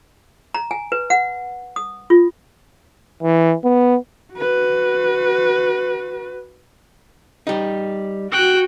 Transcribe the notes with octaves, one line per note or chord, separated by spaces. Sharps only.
A#5
G#5
B4
F#5
D#6
F4
E3
B3
F#4 B4
G3 D#4
F#4 G5 F#6